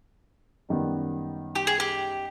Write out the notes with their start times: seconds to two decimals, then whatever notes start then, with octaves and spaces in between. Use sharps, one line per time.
0.69 F#2 D#3 G3 B3
1.55 G4
1.67 G#4
1.80 G4